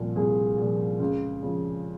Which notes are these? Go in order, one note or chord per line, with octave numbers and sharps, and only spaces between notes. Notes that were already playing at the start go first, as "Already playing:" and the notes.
Already playing: C2 A#2 F3
C2 G#4
A#2 F3
C#2
C#3 F3